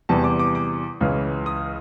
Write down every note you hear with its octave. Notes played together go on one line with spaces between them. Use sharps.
E2 C3 E3 G3 A5
D6
D6
D6
C#2 C#3 E3
D#6